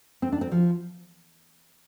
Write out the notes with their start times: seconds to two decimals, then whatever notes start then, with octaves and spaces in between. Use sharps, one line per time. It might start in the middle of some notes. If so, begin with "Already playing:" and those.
0.22 C4
0.32 D4
0.41 C4
0.52 F3